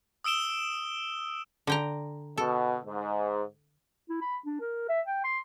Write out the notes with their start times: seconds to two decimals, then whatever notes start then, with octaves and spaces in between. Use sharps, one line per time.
0.24 D#6 E6 D7 E7 G7
1.67 D3 G5 A#5
2.38 B2 A4
2.85 G#2
4.09 E4
4.21 B5
4.46 D4
4.60 A#4
4.89 E5
5.07 G5
5.24 C6